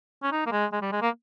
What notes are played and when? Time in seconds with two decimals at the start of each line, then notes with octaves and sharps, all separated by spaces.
0.23 C#4
0.32 D#4
0.46 A#3
0.52 G#3
0.73 G#3
0.82 G3
0.92 G#3
1.02 A#3